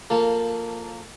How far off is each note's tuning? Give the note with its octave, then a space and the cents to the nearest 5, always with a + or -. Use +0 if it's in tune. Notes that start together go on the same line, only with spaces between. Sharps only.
F3 +0 A#3 -15 A4 +0